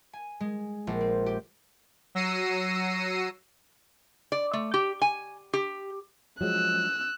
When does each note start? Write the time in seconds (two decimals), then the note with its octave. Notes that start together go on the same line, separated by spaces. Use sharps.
0.13 G#5
0.40 G#3
0.87 A#1
1.01 C4
1.26 G4
2.15 F#3 E6 A#6 C7 C#7 D#7
4.32 D5
4.53 A3
4.74 G4
5.02 G#5
5.53 G4
6.41 F3 F#3 G#3 E6 F#6